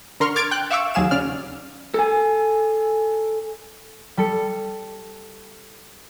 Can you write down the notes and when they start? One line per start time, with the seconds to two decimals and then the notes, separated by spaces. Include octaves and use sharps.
0.20 D3 A#4 C6 C#6 F6
0.36 D6 F6 G#6 A6 D7
0.51 G5 F#6
0.70 E5 F5 C#6 D6 E6
0.94 D#2 F#3 G#4 F5 E7
1.11 C#3 D5 F6
1.94 A4 G#5
4.17 G3 A4 C#7